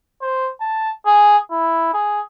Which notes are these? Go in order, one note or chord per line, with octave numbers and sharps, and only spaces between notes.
C5
A5
G#4
E4
G#4